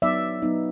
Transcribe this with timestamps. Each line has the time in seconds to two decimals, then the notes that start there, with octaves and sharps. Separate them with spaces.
0.02 F#3 B3 D#4 D5 E5
0.42 F#3 B3 D#4